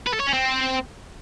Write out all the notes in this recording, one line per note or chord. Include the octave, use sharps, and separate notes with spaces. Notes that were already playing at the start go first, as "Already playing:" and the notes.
B4
A4
C#5
C#4
C4